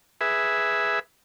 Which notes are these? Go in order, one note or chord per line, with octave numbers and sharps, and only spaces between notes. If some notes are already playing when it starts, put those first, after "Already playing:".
G#4 B4 E5